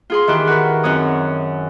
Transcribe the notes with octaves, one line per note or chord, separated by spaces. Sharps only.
F4 G#4 C6
D#3 E3 E4 G4 F#6
F#4 A#4 B4
F#2 C4 D#4 C#5 D#6